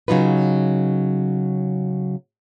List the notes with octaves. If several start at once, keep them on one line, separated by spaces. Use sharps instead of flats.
C#3 F#3 D#4 F4 B4